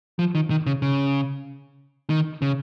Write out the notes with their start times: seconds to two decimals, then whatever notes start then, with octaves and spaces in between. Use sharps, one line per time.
0.19 F3
0.35 D#3
0.50 D#3
0.67 C#3
0.82 C#3
2.10 D#3
2.42 C#3